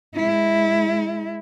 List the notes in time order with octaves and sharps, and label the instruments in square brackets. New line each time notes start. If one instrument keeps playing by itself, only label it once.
[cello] G#3 E4